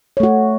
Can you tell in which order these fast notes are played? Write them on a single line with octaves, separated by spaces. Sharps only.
C#5 A3 F#4